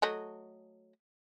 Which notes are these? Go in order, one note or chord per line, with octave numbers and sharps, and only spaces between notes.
F#3 A3 D#5